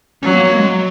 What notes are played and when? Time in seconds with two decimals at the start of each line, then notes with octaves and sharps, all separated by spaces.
0.23 F#3 C#4
0.34 A#3
0.44 A#3
0.56 G#3
0.66 F#3